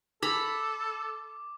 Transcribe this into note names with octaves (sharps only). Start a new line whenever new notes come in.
A4 A#5 B5 D6